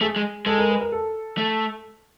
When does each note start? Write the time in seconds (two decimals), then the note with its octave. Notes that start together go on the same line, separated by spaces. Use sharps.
0.01 A3 G#4
0.16 G#3
0.46 G#3 A4
0.58 A#4
0.69 B4
0.81 A#4
0.92 A4
1.37 A3